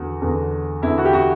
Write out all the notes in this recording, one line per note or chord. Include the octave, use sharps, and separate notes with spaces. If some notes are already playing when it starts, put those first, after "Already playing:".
Already playing: E2 D3 F#4
E2 D3
E2 D3 E4
F#4
G4
F#4